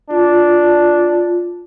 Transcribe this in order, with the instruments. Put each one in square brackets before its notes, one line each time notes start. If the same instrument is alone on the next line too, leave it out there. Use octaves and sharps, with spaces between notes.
[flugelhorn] D4 [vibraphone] F4